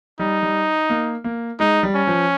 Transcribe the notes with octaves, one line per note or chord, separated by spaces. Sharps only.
G3 D#4
G3
A#3
A#3
G#3 D#4
G3
C#4
F3